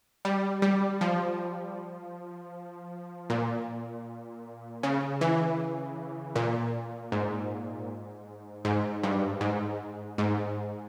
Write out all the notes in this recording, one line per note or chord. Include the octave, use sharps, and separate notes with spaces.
G3
G3
F3
A#2
C#3
E3
A#2
G#2
G#2
G2
G#2
G#2